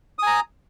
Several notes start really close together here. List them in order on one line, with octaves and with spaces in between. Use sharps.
D#6 G#5 A#5